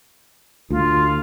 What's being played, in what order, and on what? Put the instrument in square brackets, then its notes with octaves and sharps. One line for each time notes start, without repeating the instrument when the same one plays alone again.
[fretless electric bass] D2 [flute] F4